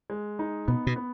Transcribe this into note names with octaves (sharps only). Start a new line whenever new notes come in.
G#3
D#4
B2 B3
B2
B3